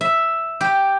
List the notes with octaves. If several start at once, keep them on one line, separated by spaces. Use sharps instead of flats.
E5
G4